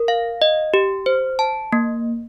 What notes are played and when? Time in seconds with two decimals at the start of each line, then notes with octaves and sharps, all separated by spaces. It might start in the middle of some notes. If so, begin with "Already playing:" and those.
Already playing: A#4
0.08 F5
0.42 D#5
0.74 G4
1.06 C5
1.39 A5
1.73 A#3